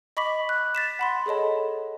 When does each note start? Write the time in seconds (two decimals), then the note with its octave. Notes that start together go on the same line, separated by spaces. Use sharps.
0.17 D#5 B5 C#6 D6 B6 F#7
0.49 F#6
0.75 A6 B6 E7
0.99 F#5 B5 C6
1.26 G#4 A4 C#5 D#5 A5